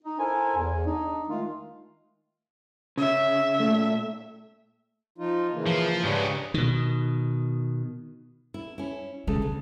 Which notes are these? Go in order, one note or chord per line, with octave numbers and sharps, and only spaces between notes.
D#4
E4 A4 A#4 C5 G#5
E2
D4 D#4
D#3 G#3 A3 D#4 F4
C#3 E5
A#2 A3
F3 D#4 F4
C#3 E3 A#3
F3
G#2 C#3 D4 G4 B4
B2 D#3
E4
C#4 E4
C#3 G#3 A3 A4
D2